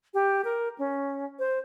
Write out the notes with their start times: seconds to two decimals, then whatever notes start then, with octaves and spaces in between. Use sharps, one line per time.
0.14 G4
0.44 A#4
0.78 C#4
1.39 C5